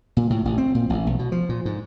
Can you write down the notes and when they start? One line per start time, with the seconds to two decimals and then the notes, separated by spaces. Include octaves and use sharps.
0.17 A#2
0.30 A2
0.45 A1
0.58 C4
0.75 A#2
0.90 A1
1.07 B1
1.19 B2
1.32 F3
1.49 A#2
1.65 G#2